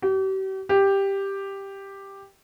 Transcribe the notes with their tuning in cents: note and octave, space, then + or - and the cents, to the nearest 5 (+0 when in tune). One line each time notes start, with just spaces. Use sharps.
G4 -40
G4 +5